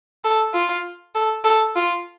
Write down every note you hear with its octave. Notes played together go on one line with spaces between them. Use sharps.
A4
F4
A4
A4
F4